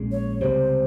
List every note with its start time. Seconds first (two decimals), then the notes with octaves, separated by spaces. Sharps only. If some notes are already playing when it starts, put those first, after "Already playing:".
Already playing: A#1 A#2 G#3 C#4
0.12 C#5
0.41 C#2 C3 G3 C5